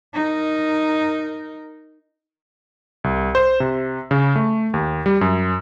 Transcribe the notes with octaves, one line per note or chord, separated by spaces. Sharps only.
D#4 A#4
C2
C5
C3
C#3
A3
D#2
G3
F#2